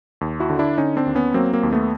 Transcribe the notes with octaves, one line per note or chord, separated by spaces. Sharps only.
D#2
E4 F#4
D3
D4 E4
D3 C#4 D#4
C4 D4
D#2
B3 C#4
F#3 A#3 C4
A#3 C4
D#2
A3 B3